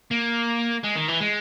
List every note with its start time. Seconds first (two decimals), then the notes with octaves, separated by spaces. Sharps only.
0.11 A#3
0.84 G#3
0.96 D#3
1.08 E3
1.20 G#3